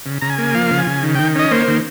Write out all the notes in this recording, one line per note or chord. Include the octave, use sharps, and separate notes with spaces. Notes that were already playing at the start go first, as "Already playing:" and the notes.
C#3
C#3 A#5
G#5
A#3
F3 F5
C#3
G#5
C#3
D#3
D#3 G5
C#4 D#5
A#3 C5
D#3